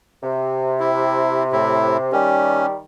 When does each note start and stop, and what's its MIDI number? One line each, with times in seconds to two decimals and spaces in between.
0.23 2.10 48
0.80 1.43 64
1.52 1.97 45
1.52 1.97 64
2.12 2.79 51
2.12 2.79 55
2.12 2.66 61